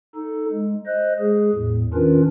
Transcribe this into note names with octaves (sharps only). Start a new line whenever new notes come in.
D#4 A4
G#3
C5 D#5 F#6
G#3 G#4
E2 A2
D#3 C#4 D4 F4 A#4 B4